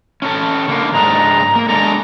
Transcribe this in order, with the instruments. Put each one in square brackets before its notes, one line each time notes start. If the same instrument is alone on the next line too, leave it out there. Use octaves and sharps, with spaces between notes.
[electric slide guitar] C#4 D4 A4
D3 A#3
[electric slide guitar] G#2 G#3 D4 [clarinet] A#5
[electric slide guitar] A#3
[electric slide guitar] G#3 D4 A4 [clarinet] A#5